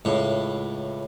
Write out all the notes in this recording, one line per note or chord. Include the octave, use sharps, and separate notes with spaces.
C#2 A2